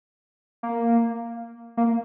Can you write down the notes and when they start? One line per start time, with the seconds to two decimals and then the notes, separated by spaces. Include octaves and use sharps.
0.63 A#3
1.77 A#3